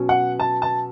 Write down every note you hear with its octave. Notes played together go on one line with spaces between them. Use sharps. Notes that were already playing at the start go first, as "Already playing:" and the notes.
Already playing: B2 F#3 C#4
F#5
A5
A5